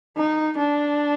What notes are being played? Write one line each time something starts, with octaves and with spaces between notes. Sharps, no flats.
D#4
D4